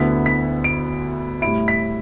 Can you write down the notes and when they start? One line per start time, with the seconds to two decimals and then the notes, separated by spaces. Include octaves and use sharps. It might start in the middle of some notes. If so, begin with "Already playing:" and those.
Already playing: D2 D3 B3 E4 B6
0.26 B6
0.64 D7
1.42 A2 G3 E4 D7
1.68 B6